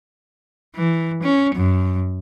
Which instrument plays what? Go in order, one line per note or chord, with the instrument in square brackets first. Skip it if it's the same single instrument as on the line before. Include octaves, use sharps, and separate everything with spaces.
[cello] E3
C#4
F#2